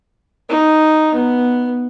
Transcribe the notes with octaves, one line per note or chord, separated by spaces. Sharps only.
D#4
B3